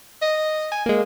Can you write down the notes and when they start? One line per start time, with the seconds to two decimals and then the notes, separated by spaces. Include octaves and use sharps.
0.22 D#5
0.72 G#5
0.86 G#3 A#3